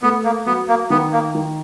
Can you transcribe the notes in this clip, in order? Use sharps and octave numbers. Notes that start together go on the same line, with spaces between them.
A3 B3
A#3
F#3 B3
A#3
D#3 B3
A#3
D#3